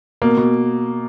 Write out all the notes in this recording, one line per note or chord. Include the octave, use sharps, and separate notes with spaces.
B2 A#3
B2